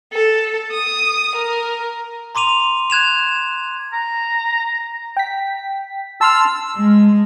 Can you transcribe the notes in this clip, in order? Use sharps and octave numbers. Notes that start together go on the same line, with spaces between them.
A4
D#6
A#4
A#5 C6 D6 D#7 F7
F#6 G#6 E7 F7
A#5
G5 B6
A5 C6 E6 F6
G#3